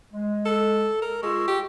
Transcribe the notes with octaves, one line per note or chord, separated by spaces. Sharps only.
G#3
A4
A#4
G#3 F4 C#6 E6
G4